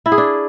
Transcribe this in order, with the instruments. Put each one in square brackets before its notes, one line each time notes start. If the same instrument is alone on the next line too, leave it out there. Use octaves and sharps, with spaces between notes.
[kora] E4
G#4
D4